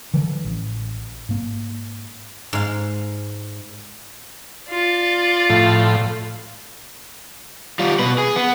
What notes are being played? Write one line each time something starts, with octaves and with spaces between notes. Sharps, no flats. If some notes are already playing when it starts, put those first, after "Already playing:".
D3 E3 F3 G3
A1
G#2 A#3
G#2 F5
F4 D5
A2 F3
G3 F4
B2 B4
G#4
B3